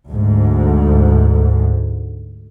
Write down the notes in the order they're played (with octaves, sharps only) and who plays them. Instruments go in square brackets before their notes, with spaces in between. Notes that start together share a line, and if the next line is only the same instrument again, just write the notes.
[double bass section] D2 G#2